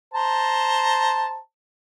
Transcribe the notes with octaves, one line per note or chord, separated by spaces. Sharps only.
C5 A5 A#5